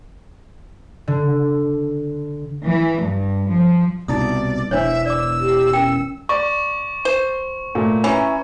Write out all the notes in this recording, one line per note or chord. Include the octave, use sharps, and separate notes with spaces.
D3
E3
G2
F3
C2 B2 D#4 E4 D5 D#6
E1 E2 E3 D4 C5 C#5 E5
D5 D6 E6
G4
C#4 A#4 G5
D5 C#6
C5
A#2 A3
E3 C#4 A#5